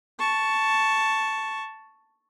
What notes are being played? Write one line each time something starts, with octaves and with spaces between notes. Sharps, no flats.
A5 C#6